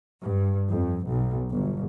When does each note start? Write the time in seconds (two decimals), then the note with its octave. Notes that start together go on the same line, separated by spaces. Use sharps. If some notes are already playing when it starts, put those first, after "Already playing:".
0.22 G2
0.71 F2
1.08 B1
1.50 G1